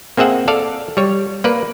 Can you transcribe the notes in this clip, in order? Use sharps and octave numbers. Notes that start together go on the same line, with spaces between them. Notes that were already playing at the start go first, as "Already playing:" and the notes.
A#3 C4 G#4 E5 F#5
A4 D5 F5
G3 C#5
A#3 B4 D5